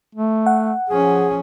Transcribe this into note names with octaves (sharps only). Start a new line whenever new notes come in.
A3
F#5
F3 C#4 G#4